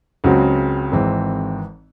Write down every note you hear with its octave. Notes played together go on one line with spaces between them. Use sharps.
C#2 C#3 F#3 C4 F#4
G#1 G#2 E3 C4